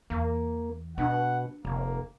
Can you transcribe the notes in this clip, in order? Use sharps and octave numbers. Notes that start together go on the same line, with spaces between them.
E2 E3 A#3
B2 D4 F#5
F1 C3 A#3